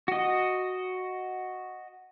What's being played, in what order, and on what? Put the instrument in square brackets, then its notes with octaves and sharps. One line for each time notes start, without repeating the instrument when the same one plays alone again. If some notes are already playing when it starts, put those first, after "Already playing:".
[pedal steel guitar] F#4 D#5